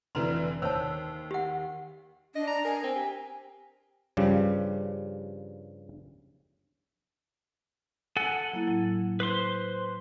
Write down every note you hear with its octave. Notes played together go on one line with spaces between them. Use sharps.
F1 D3 E3 B4 A#5 C6
D#2 C5 C#5 A5 E6
G4 F#5
D4 D#5
A#5
A#4 G#5
C4
G4
G2 C#3 F3 G3
A4 F#5 G#5
F#3 A#3 E4
A2 F#3
B4 C5 C6